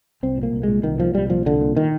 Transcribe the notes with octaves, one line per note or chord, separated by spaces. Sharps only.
C2 C4
A#2
A#3
C2
A#2 G#3
C2 D#3
A#2 F3
C2 G3
A#2 F3
C2 D3
A#2
D#3